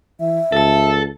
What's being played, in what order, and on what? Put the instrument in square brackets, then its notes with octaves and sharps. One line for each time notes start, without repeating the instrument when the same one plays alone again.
[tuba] E3 [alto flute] E5
[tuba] C#2 [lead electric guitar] A4 A5